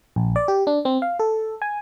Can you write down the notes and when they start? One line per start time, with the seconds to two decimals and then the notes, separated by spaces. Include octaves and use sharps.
0.16 A#1
0.36 D5
0.48 G4
0.67 D4
0.85 C4
1.02 F5
1.19 A4
1.62 G#5